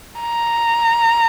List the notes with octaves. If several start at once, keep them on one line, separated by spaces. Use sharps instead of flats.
A#5